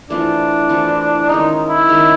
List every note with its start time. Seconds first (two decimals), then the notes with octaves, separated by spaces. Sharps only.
0.10 E3 A3 C4 D4 F4
0.69 E3 A3 C4 F4
1.29 D#3 G#3 C#4 D#4
1.69 E4
1.89 D#3 G#3 C#4